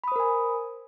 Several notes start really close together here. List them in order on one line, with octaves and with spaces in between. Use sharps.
B5 D#6 C5 A#4 G#5